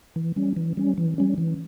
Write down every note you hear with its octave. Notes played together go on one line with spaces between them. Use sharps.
E3
G3 C#4
E3
G3 C#4
E3
G3 C#4
E3